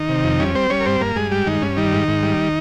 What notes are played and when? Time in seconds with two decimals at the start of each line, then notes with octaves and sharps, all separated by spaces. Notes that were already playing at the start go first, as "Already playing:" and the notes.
Already playing: D#3 D#4
0.09 C3
0.24 F2
0.40 G3 C#4
0.55 G3 C4 C5
0.70 G3 C#4 C#5
0.81 A#4
0.86 G2 C4 C5
1.01 G2 A#3 A#4
1.16 G2 G#3 G#4
1.31 G3 G#3 G4
1.46 G2 D#3 D#4
1.62 G2 C#4
1.77 D#3 G3 D#4
1.93 G#2
2.08 G#2
2.23 G3